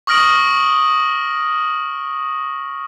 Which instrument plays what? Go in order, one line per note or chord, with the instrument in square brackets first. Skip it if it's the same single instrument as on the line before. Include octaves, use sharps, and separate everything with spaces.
[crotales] C#6 D#6 F6 A#6 D7 F#7